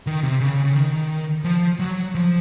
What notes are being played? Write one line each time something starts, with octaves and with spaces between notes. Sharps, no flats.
D#3
C3
C#3
C#3
D#3
F3
F#3
F3